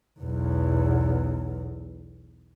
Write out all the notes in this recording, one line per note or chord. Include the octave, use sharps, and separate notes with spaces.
B1 E2